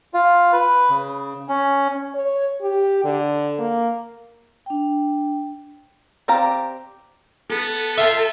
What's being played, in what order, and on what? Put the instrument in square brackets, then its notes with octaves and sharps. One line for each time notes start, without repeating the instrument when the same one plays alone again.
[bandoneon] F4
B4
C#3
C#4
[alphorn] C#5
G4
D3
A#3
[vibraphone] D4 G5
[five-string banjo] C4 G4 D5 F5 A#5
[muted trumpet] B3 [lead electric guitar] A4
[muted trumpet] F4 [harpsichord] E5 G5